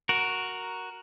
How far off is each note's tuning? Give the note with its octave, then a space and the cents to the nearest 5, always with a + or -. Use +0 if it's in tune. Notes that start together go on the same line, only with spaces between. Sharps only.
F#4 +0 A#4 +0